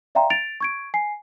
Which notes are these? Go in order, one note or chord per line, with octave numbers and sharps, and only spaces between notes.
D5 E5 F5 G5 A#5 C6
A6 D7 F7
C#6 G#6 D7
G#5 C7